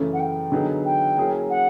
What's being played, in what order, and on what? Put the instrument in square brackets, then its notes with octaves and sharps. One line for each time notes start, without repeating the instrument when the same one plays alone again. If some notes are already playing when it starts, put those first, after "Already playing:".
Already playing: [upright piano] F#2 C#3 E3 A3
[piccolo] F#5
G5
[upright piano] D3 F#3 B3 D#4 G#4
[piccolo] G5
[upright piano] F#3 A#3 C#4 E4 G#4
[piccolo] F#5